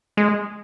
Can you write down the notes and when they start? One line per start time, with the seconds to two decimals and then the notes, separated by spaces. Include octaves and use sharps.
0.17 G#3